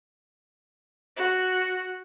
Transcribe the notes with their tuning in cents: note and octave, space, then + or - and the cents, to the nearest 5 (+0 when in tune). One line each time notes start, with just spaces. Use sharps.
F#4 +0